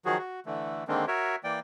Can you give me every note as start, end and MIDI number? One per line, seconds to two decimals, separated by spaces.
0.05 0.18 51
0.05 0.18 53
0.05 0.18 54
0.05 0.18 66
0.05 0.18 68
0.18 0.40 66
0.46 0.84 50
0.46 0.84 52
0.46 0.84 57
0.88 1.05 50
0.88 1.05 51
0.88 1.05 56
0.88 1.05 58
0.88 1.05 60
0.88 1.05 62
1.08 1.36 66
1.08 1.36 70
1.08 1.36 73
1.08 1.36 76
1.44 1.59 52
1.44 1.59 58
1.44 1.59 74
1.44 1.59 79